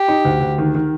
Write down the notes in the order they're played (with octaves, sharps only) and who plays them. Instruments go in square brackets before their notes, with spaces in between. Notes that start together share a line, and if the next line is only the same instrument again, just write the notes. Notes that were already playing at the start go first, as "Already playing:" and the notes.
Already playing: [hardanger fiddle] G4
[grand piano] D#4
D2
D2
D#3
D#3